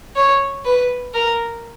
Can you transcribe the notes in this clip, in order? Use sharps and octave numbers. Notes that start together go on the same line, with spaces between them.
C#5
B4
A#4